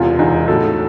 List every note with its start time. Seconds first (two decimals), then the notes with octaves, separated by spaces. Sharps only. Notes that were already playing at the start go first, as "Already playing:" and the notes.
Already playing: E1 E2 C3 F4
0.19 E1 E2 C3 D#4
0.48 A#1 A2 F#3 A4